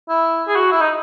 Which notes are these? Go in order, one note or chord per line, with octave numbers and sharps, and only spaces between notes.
E4
G#4
F#4
E4
D#4